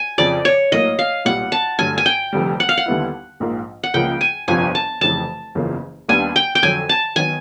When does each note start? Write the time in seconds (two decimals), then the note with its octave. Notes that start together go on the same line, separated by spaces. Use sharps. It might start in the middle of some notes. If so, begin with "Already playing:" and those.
Already playing: G#5
0.18 F2 C#3 F3 D5
0.45 C#5
0.72 A2 F#3 A#3 D#5
0.99 F5
1.25 B1 A#2 G3 F#5
1.52 A5
1.79 G2 D3 F#3 A3 G#5
1.98 G#5
2.06 G5
2.33 F1 F2 D3 G3
2.60 F#5
2.69 F5
2.77 F#5
2.86 D#2 D3 G3 B3 E4
3.40 A#1 G#2 F3 A#3
3.83 F#5
3.94 C#2 C#3 F3 A#3 G5
4.21 G#5
4.48 G1 F2 C3 F3 G#5
4.75 A5
5.01 F1 F2 C#3 E3 A5
5.55 F#1 E2 C#3 F3 A#3
6.08 D#2 D#3 G3 B3 D4 G#5
6.36 G5
6.55 G5
6.63 F2 D3 F#3 G#5
6.89 A5
7.16 D#3 F#3 B3 G#5